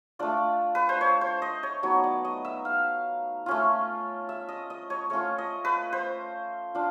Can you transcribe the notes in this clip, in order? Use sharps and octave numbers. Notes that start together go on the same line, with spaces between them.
A3 D4 F4 D5
B4
C5
C#5
C5
D#5
C#5
F#3 B3 D#4 C#5
D5
D#5
E5
F5
A3 C#4 F4
E5
D#5
D#5
C#5
A3 C#4 F4 C#5
D#5
B4
C5
D4 F4